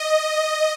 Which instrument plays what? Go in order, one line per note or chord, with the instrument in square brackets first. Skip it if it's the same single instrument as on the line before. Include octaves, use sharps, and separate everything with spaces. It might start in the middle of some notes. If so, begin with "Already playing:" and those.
Already playing: [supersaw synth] D#5